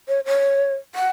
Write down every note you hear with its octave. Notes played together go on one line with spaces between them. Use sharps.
C#5
C#5
F#5